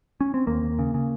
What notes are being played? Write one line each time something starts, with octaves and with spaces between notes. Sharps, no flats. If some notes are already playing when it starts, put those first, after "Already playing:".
C#4
C4
D#2 A#3
D#2
C#3
C#3